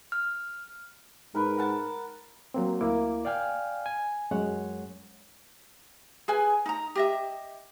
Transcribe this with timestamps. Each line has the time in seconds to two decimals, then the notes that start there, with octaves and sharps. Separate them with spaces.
0.12 F6
1.35 G#2 A#4 B4
1.57 A#4 F#5 A5
2.54 F#3 A#3 C4
2.81 D2 A#3 E4 D6
3.25 D5 F5 G5 G#5 F6
3.86 G#5
4.31 F#2 G#3 C#5 F#5
6.28 G#4 B4 G#5
6.66 D#4 A#5
6.95 G4 D#5 E5